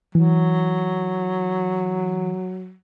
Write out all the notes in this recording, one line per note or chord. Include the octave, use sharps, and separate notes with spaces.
E3 F#3